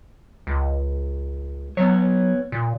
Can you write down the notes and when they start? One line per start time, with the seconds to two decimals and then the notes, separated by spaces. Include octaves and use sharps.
0.47 C#2
1.77 F#3 B3 C#5
2.52 A#2